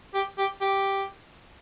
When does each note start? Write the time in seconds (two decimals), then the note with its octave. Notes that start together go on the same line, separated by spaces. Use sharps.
0.14 G4
0.38 G4
0.61 G4